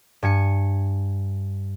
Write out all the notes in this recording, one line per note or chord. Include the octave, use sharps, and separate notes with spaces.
G2 G#5 C#7